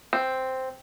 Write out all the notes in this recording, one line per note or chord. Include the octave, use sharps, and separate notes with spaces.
C4